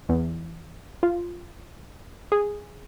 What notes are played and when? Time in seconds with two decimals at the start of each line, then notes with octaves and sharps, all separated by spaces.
0.09 E2
1.03 F4
2.32 G#4